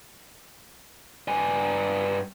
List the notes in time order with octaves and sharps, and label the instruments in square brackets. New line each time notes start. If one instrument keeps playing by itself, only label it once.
[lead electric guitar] G2 G#5